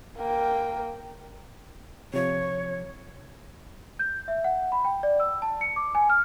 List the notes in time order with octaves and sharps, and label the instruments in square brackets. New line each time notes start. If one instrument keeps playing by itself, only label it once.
[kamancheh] A#3 G5
[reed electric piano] C3 F3 [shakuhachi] C#5
[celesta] G6
E5
F#5
B5
G5
D5
E6
A5
C#7
D6
G#5
F6